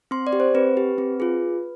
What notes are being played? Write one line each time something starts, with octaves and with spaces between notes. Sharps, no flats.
C4 C6
D5
G4
C5
C4 B4
G4
C4
F4 G#4